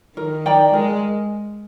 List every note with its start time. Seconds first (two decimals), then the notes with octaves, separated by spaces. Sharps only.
0.17 D#3 A#4
0.46 D5 G5 A#5
0.73 G#3 A#4